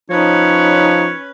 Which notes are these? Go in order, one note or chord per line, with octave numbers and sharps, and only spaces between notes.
F3 C#4 D#4 B4 C#5